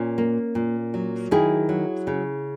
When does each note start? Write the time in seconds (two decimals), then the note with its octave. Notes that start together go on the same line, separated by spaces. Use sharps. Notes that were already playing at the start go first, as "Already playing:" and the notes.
Already playing: A#2 C#4
0.18 A#3
0.55 A#2
0.94 F#3
1.31 D#3 E4 G#4
1.69 F#3
2.07 C#3